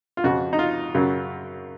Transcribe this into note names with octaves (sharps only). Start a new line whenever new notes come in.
F4
F2 C#3 F3 F#4
D#4
F4
F#2 C#3 F#3